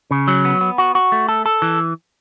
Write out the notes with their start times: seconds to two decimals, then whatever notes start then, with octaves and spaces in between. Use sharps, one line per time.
0.11 C#3
0.28 F#3
0.45 B3
0.61 B3
0.78 F#4
0.95 F#4
1.12 A3
1.29 A4
1.46 A4
1.62 E3